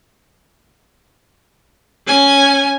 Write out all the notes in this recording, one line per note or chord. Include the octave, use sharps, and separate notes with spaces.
C#4 G#5